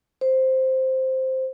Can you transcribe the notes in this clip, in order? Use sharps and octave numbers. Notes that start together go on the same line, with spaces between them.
C5